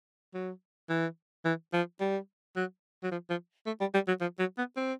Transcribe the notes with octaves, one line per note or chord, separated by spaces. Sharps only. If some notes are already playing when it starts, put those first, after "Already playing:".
F#3
E3
E3
F3
G3
F#3
F#3
F3
F3
A3
G3
G3
F#3
F3
F#3
B3
C4